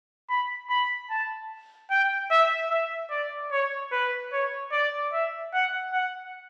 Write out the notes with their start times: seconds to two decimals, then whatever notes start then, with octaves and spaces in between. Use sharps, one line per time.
0.29 B5
0.69 B5
1.10 A5
1.90 G5
2.30 E5
2.70 E5
3.10 D5
3.51 C#5
3.92 B4
4.32 C#5
4.72 D5
5.13 E5
5.53 F#5
5.93 F#5